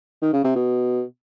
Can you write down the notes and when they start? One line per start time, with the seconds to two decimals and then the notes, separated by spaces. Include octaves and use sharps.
0.22 D#3
0.33 C#3
0.44 C3
0.55 B2